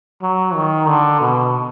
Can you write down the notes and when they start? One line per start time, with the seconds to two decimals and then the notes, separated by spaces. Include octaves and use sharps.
0.22 F#3
0.55 D#3
0.88 D3
1.21 B2